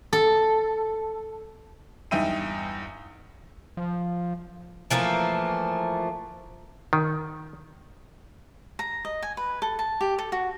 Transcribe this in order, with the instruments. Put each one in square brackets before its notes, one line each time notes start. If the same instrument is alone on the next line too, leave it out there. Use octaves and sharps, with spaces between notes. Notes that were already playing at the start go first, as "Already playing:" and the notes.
[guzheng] A4
[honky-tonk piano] E2 G2 D#4 E5 G5 D#7
[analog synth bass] F3
[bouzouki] E3 F3 A3 A#3
[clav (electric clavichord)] D#3
[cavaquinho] A#5
D#5
G#5
B4
A4
A5
G4
A4
F#4